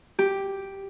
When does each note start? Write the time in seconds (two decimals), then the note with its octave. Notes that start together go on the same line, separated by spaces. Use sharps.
0.19 G4